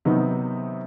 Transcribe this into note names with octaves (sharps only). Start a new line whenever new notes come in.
C3 D#3 F#3 B3 D#4